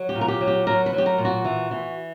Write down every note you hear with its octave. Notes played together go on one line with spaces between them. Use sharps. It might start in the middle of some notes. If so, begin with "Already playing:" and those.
Already playing: F#3
G4
A#2
A#4
G4
F#3
G4
F#3 A#4
B4
F#3
G4
A#4
A#2
F#4
E3
E3